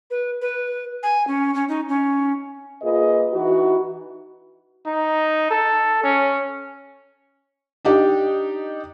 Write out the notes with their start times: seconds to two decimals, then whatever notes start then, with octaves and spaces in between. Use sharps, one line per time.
0.11 B4
0.42 B4
1.03 G#5
1.27 C#4
1.55 C#4
1.69 D#4
1.89 C#4
2.82 A#2 F4 G#4 B4 D#5
3.33 E3 D#4 F#4
4.86 D#4
5.50 A4
6.03 C#4
7.85 D4 D#4 G4